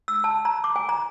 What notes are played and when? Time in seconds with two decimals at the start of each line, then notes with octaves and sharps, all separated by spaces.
0.08 E6
0.24 A5
0.45 A#5
0.64 D6
0.76 G#5
0.89 A#5